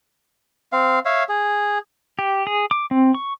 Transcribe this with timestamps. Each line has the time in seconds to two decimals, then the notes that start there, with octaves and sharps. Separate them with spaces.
0.72 C4 F5
1.05 C#5 E5 F5
1.29 G#4
2.19 G4
2.47 G#4
2.71 D6
2.91 C4
3.15 C#6